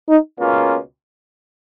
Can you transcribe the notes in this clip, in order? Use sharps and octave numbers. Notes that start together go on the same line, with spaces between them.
D#4
C#2 B2 A#3 C#4 F4